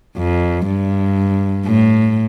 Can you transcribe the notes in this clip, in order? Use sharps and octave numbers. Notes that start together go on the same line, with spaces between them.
F2
G2
A2